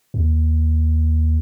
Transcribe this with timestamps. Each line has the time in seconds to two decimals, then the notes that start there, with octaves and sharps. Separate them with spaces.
0.14 D#2